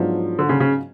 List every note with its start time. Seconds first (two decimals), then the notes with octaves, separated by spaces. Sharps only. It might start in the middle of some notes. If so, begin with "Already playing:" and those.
Already playing: G#2 F3 F#3 B3 D4 F4
0.39 D3
0.49 C#3
0.60 C#3